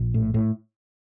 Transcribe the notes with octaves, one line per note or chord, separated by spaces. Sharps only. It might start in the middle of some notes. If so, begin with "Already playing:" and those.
Already playing: A#1
A2
A2